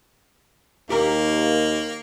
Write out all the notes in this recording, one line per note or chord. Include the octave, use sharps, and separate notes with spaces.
D#2 A#3 G4 A#4